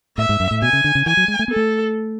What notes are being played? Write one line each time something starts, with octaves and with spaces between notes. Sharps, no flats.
A2 E5
G#2
F#2
A2
B2 G#5
C#3
D3
C#3
E3 G#5
F#3
G#3
A3
B3 A4
A3